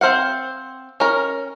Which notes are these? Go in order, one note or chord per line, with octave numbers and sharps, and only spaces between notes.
C4 C5 F5 F#5
C#4 A#4